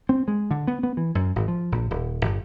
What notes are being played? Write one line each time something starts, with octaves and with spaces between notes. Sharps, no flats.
C4
G#3
D3
B3
B3
E3
F#2
G#1
F3
A#1
D#1
G1